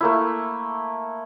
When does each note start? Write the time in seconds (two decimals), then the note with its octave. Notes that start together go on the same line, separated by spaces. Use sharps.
0.01 A3 A#3 E4